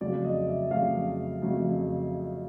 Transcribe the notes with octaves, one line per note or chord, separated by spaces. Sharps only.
F2 C#3 F#3 A3 D5
D#5
E5
F2 C#3 F#3 A3 F5
F2 C#3 F#3 A3